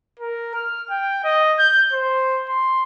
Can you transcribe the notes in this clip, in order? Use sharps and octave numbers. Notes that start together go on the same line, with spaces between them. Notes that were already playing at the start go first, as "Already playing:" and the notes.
A#4
F6
G5
D#5
G6
C5
C6